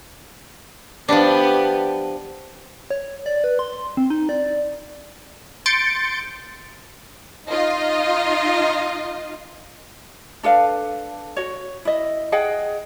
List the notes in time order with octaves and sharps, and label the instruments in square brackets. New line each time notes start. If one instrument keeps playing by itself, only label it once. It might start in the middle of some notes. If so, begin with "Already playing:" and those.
[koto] F3 D4 [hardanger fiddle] B3 G4
[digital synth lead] C#5
D5
B4
C6
C4
D#4
D5
[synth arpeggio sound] C6 G6 A6 C#7 D7
[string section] D#4 F4 D#5
[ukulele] D4 A4 B4 F5
F#4 C#5
E4 D#5
G#4 D#5 F#5 G5